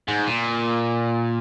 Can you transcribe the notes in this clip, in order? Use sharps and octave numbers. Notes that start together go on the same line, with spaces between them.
G#2
A#2